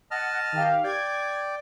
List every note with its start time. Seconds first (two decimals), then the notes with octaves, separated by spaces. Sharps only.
0.11 D#5 F#5 A5 F6
0.52 D#3 G4 F5
0.84 D5 G5 G#6